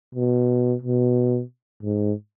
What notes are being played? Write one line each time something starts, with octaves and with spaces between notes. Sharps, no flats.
B2
B2
G#2